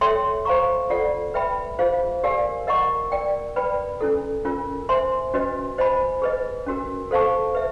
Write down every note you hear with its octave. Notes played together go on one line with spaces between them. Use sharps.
A4 C#5 E5 G5 C6
C5 F5 A#5 C#6
F4 A4 D5 F#5
B4 E5 G5 B5
F4 G#4 C5 F5
G4 A#4 D5 F5 G#5
A#4 D#5 F#5 A#5 C#6
A#4 D5 G5
B4 D5 G5 B5
C#4 E4 A4
C#4 F4 A#4
C5 E5 G#5 C6
C#4 F#4 B4 D#5
C5 D#5 G#5 B5
G#4 B4 D#5
C#4 F#4 A#4
A4 C5 F5 A5 C#6
B4 E5